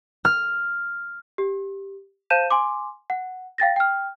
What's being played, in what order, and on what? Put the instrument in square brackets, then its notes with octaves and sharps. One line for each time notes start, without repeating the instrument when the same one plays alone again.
[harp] F6
[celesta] G4
C5 F5 A5 G6 D#7 E7
G#5 C6 D6
F#5
F5 G5 A6 A#6
G5 F6